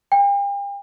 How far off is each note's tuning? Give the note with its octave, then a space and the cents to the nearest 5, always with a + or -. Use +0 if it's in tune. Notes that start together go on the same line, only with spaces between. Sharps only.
G5 +40